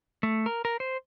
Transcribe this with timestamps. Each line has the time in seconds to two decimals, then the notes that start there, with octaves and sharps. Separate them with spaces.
0.23 A3
0.46 A#4
0.65 A#4
0.80 C5